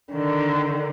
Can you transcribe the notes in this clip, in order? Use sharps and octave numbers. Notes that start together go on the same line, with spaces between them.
D3 D#3